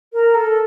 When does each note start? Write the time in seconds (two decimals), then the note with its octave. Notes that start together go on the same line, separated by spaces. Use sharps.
0.13 A#4
0.35 A4